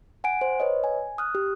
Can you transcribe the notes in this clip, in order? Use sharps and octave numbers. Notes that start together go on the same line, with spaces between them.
F#5 G#5 D7
C5
B4 C#5 D#5
G#5
D#6 F6 F#6
G4